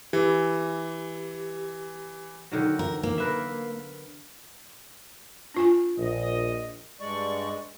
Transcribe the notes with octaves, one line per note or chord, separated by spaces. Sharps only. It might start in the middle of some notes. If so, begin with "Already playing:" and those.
E3 G4
D3 D#3 F#3
A#4
A#3
A#4 B4 E5
D4 F4 G#5
A#1 D#5
G2 G#3 D5 C#6